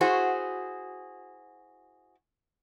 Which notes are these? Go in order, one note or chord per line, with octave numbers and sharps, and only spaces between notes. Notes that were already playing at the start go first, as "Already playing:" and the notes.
E4 F#4 G#4 C5